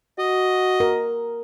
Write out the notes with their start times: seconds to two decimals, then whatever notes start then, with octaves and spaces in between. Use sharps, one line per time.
0.19 F#4 D#5
0.80 A#4